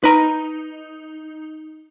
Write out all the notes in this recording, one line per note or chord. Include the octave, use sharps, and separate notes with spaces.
D#4 B4 A#5